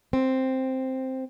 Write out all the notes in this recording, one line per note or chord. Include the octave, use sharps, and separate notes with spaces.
C4